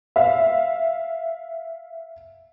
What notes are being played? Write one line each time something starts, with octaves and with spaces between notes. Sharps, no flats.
E5 F5